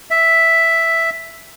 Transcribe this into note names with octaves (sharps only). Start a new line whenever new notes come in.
E5